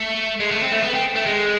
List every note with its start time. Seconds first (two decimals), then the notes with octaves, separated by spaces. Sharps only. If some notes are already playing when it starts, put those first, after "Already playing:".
Already playing: A3
0.40 G#3
0.51 A3
0.62 C4
0.72 A3
0.82 B3
0.94 C4
1.16 A3
1.26 G#3